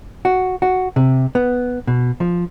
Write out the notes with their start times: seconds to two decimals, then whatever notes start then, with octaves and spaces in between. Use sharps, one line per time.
0.25 F#4
0.62 F#4
0.96 C3
1.35 B3
1.87 B2
2.20 F3